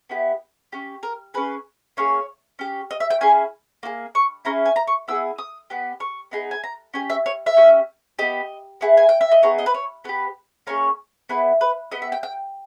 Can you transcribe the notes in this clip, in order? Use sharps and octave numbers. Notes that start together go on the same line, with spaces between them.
B3 E4 G4
C#4 G4
A#4
C#4 G#4 B4
A#3 C#4 G#4 C#5
C#4 G4
D#5
E5
G5
C#4 E4 G#4 G#5
A#3 E4 G#4
C#6
C#4 E4 G#4 A#5
G#5
A#5
C#6
B3 E4 G#4 E6
D#6
B3 G4
C#6
B3 D#4 G#4
G#5
A#5
C#4 G4 G#5
E5
C#5
E5
C#4 G4
B3 G4 D#5
B3 E4 G#4
G#5
G5
E5
D#5
B3 D#4 G#4 C#5
D#5
B4
C#5
B3 G4 B4
A#3 C#4 G#4 C#5
B3 E4 G#4 B4
B4
B3 G4 D#5
E5
G5
G5